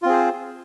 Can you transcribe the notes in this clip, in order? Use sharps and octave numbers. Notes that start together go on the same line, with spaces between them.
C4 F4 G#4 C5